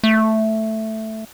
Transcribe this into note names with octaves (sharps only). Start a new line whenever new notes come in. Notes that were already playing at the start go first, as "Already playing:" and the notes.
A3